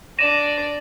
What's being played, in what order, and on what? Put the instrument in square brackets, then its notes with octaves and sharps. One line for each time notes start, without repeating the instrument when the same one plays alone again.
[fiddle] D4 D5 [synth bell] A#6 D#7 E7